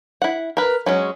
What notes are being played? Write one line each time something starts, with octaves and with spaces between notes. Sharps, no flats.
E4 F#5
A#4 B4
F#3 G#3 C#4